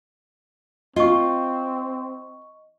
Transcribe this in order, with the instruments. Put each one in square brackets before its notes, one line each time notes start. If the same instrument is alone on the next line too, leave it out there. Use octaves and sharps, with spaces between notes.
[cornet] C4 [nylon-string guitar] F4 [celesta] D#5 C#6